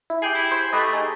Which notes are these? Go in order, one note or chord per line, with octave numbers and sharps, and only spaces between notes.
E4
G4 G#4 G5 C7
E4
C5
A3 G4 B4 D#5
D#4 G#4